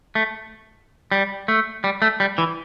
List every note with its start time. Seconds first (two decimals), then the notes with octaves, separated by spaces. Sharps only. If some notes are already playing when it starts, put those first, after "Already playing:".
0.15 A3
1.12 G3
1.48 A3
1.84 G3
2.02 A3
2.20 G3
2.38 E3